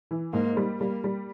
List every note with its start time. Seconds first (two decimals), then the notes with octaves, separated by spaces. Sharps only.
0.11 E3
0.33 G#2 A#3
0.57 G3
0.80 G3 A#3
1.04 G3